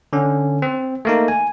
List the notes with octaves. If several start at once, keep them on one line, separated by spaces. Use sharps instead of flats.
D3 C#4
C4
A3 A#3 D#4
G#5